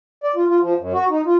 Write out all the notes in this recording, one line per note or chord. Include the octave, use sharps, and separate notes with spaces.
D5
F4
F4
F3
F#2
F#4
D#4
F4